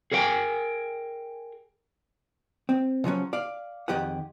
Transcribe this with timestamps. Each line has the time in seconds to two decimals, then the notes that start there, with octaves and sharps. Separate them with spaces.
0.12 G#4 A#4 C#5 F5 G5 G#5
2.69 C4
3.04 C#3 F3 F#3 C#4
3.33 D5 F5
3.88 F2 D#3 G4 G#4 F#5